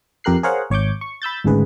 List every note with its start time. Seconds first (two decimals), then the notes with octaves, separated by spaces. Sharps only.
0.24 F2 G4 A#4 F#6 C7
0.43 G#4 A#4 C5 C#5 F5 F#5
0.70 G#1 C#5 C#6 D6 G6
1.01 C#6
1.22 B5 E6 G6 A6
1.44 G#1 D2 G#2 C#3 G#4 B4